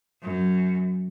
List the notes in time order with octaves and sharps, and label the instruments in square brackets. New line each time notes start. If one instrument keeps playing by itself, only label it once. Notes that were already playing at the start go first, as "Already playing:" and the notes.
[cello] F#2